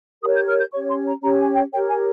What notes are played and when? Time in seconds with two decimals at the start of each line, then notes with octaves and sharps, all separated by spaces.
0.22 G4 A#4 C#5 D#6
0.35 G6
0.48 F6
0.60 G6
0.72 C#4 G4 C#5 C#6
0.89 C6
1.06 A#5
1.22 C#4 G4 C#5 A#5
1.38 G#5
1.54 G5
1.72 G4 A#4 C#5 G5
1.88 G#5